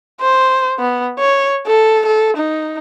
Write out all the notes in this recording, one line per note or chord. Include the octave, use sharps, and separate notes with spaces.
C5
B3
C#5
A4
A4
D#4